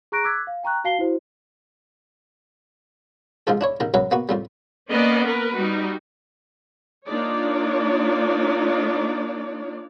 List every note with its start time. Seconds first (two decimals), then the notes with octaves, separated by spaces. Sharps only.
0.12 G#4 A#5 C#6 F#6 A#6 D7
0.24 D6 E6 F#6 G#6 B6
0.47 F5
0.63 G5 A#5 C#6 F#6
0.84 F#4 F5 A5 C7 G7
0.99 E4 F#4 C5
3.47 A1 G#2 F3 F4 A4
3.61 D4 E4 C#5
3.80 A1 D#3 A#5
3.94 F#2 F#3 C#4 B4 E5 A#5
4.11 A#3 B3 F#4
4.29 F2 A2 G3
4.89 A#3 B3 C#4 D5 D#5
5.25 A#4 B4
5.55 G3 D#4 F#4
7.07 A#3 D4 D#4 F4 C#5 D5